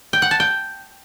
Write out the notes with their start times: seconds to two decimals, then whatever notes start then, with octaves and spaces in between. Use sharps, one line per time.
0.13 G5
0.22 F#5
0.31 A5
0.40 G5